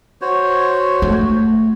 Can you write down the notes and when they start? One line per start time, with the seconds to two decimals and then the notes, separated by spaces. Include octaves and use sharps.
0.22 F#4 C5 C#5
1.02 A3